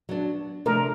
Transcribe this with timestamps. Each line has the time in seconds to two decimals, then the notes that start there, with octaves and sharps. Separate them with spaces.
0.09 F#3 B3 D4
0.66 C3 F3 A3 D4 A#4